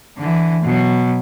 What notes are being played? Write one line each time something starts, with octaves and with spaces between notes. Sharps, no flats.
D3 E3
B2 F#3